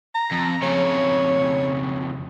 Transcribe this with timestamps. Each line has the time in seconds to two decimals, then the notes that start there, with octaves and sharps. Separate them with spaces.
0.15 A#5
0.32 F2
0.62 F2 C#3 C#5